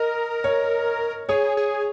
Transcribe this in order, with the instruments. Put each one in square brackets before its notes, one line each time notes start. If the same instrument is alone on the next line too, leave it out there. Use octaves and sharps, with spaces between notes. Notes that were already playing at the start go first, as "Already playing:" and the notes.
Already playing: [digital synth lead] A#4 [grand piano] D#5
[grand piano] C#5
[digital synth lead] G#4 [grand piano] C#5
[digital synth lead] G#4